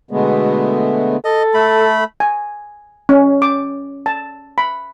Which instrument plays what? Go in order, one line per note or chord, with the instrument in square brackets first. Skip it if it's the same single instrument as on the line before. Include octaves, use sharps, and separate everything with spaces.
[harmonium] B2 D3 G#3 A3 B3
[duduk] A4 [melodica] D#5
[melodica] A3 B5
[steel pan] G#5
C#4
D6
A5
B5